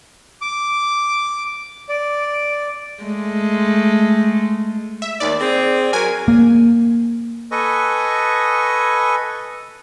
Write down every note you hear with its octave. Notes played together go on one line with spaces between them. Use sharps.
D6
D5
G#3 A3
E5
D#2 D#3 D5
C4 G#4
F#3 A#4 G#5
A#3
A4 B4 D#5 G#5 C#6